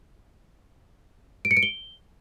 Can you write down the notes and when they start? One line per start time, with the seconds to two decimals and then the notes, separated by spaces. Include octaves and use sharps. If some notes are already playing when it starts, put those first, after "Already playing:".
1.45 D7
1.51 C#7
1.57 D7
1.63 G7